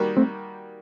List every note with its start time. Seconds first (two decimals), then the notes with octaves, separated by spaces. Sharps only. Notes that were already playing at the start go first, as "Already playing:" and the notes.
Already playing: D#3 G3 A#3 F#4
0.17 A3 C4